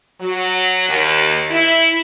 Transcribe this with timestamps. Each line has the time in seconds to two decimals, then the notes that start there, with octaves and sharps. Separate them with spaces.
0.21 F#3
0.89 D#2
1.50 E4